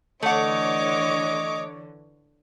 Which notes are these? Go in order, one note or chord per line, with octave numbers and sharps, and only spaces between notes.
D3 E3 A3 C#5 D#5 F#5 D6